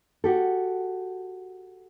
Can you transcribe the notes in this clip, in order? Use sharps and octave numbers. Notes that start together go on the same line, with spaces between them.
F#4 G4 A4